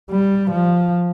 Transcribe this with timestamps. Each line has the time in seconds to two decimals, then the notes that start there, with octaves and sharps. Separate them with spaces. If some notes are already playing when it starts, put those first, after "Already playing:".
0.11 G3
0.51 F3